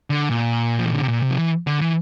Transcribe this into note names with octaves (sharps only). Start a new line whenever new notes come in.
D3
A#2
F3
E3
D3
C3
A#2
C3
F3
E3
D3
E3